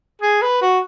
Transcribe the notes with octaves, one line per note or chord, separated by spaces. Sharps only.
G#4
B4
F#4